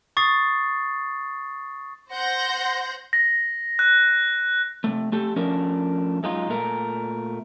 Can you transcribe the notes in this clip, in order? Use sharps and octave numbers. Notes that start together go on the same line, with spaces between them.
C#6 D#6 A6 C7
C5 F#5 C6 G6 A#6
A#6
F#6
C3 A3
A3 G4 A4
F3 A3 C#4 D4 A#4
F#2 G#3 D#4 F4
A#2 A3 A#4